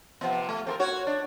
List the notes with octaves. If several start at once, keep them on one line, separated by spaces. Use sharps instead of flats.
C3 F3 B3
A3
C4 A4 A#4
F#4 C#5
D4